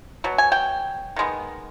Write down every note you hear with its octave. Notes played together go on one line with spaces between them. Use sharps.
B2 F#3
G#5
G5
D#3 G#3 B3